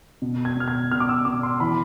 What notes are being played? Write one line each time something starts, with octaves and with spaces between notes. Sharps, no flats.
B2
G#6
B2 F6
G#6
B2 F6
D6
E6
B2 D6
C6
E3 B5